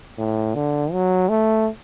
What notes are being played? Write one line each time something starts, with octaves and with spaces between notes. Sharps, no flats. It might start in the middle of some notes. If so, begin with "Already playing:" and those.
A2
D3
F#3
A3